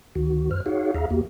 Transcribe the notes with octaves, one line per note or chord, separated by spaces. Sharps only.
D2 D#3 F#4
F#2 C5 F6
D#4 F#4 G#4 C#5 F5 F#5
D#2 G#4 E5 F5 A#5
E2 A#3 F#4 G4